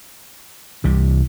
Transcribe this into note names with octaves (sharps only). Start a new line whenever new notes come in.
C2 C3 E3 G3